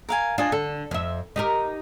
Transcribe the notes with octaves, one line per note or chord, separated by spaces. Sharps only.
A#4 F5 G#5
D4 F4 D#5 G#5
D3 A4
F2 E5
D#4 G4 A#4